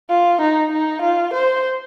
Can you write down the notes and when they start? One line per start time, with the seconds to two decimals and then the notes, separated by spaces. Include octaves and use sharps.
0.09 F4
0.41 D#4
0.72 D#4
1.02 F4
1.33 C5